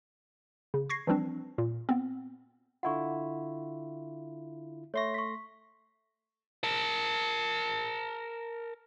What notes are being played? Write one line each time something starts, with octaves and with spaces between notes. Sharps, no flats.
C#3
C#6 G#6 A#6 C7
E3 F3 G3 C4 D4
A#2
B3 C4
D3 E4 F4 F#5 C#6
A3 C#5 E5 C6 C#6 A#6
C#6 B6
A#4 A5